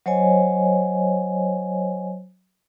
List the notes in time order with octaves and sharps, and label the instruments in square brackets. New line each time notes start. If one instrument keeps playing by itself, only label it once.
[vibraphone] F#3 C5 C#5 D#5 G#5